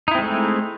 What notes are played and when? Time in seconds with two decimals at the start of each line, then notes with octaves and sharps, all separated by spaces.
0.08 D#4
0.11 E4
0.15 C4
0.18 G#3
0.22 A3